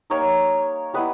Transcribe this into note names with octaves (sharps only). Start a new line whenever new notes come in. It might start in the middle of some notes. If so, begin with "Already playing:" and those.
G3 A#3 D#4 A#4 C#5
G3 B3 E4 B4 D#5